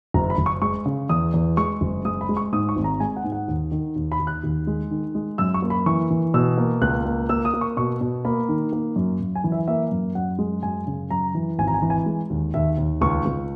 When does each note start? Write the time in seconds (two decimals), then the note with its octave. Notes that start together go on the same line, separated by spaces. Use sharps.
0.14 F#1 A#5
0.30 B5
0.38 F#1
0.46 C#6
0.62 G#3 C#6
0.86 C#3
1.09 E2 D#6
1.34 E2
1.57 G#3 C#6
1.81 F#1
2.05 G#3 D#6
2.21 B5
2.29 G#3
2.37 C#6
2.53 G#2 D#6
2.69 C#6
2.76 G#1
2.84 A#5
3.00 G#3 G#5
3.17 F#5
3.24 G#2
3.32 F#5
3.48 D#2
3.72 D#3
3.96 D#2
4.12 B5
4.20 D#2
4.27 F#6
4.43 D#2
4.67 G#3
4.91 D#3
5.15 G#3
5.38 F#2 E6
5.54 C#6
5.62 A#3
5.70 B5
5.86 E3 C#6
6.10 E3
6.34 B2 E6
6.58 A#3
6.82 C#2 F#6
7.05 A#3
7.29 A#3 E6
7.45 D#6
7.54 A#3
7.61 C#6
7.77 B2 C#6
8.01 B2
8.25 A#3 B5
8.49 D#3
8.73 A#3
8.96 F#2
9.20 F#2
9.35 G#5
9.44 E3
9.52 E5
9.68 A#3 E5
9.91 F#2
10.15 F#2 F#5
10.39 G#3
10.63 F#2 G#5
10.87 C#3
11.10 F#2 A#5
11.34 E3
11.58 G#1 G#5
11.67 A#5
11.74 G#5
11.82 E3
11.90 G#5
12.06 G#3
12.30 D#2
12.54 D#2 E5
12.77 D#2
13.01 C#2 C#6
13.25 C#2